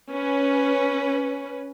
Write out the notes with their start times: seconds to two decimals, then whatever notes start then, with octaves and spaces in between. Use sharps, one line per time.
0.11 C#4 B4